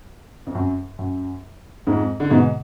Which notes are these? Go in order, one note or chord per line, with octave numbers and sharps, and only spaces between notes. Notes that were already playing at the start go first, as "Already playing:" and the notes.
F2
F#2
F#2
F2 G#2
D3
G#2 B2